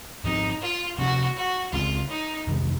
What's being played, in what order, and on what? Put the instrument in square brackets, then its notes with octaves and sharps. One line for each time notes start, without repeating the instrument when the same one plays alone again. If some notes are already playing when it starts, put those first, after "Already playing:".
[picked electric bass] G#2 F3 C4 [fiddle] D#4
[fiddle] F4
[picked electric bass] C3 F3 A#3 C#4 [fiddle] F#4
[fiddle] F#4
[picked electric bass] C#2 C#3 G#3 C4 [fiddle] F4
[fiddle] D#4
[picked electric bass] F2 C3 D#3 G#3